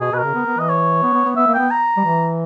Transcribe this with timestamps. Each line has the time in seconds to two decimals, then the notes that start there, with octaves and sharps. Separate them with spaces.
0.01 B2 G#4
0.12 B2 B4
0.18 A#4
0.24 C#3
0.35 B3
0.46 B3
0.58 E3 D#5
0.69 C#5
1.03 B3
1.14 B3
1.25 B3
1.36 B3 E5
1.47 A#3
1.53 G5
1.59 B3
1.70 A#5
1.97 G3
2.05 E3